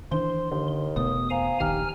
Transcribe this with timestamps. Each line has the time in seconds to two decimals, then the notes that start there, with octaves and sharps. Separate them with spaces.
0.11 D#3 E3 D4 C5 C6
0.51 D#2 D3
0.96 E1 B2 A3 B3 D#6
1.30 C4 F5 G#5 A#5
1.60 D#1 A#1 D#3 G4 G#5 A#5 F6